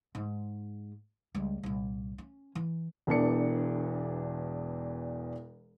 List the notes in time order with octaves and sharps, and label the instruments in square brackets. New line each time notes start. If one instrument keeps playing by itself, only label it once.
[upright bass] G#2 G#3
C#2 G3
C2 A#2
C#4
E3
[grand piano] E1 E2 D4 C#7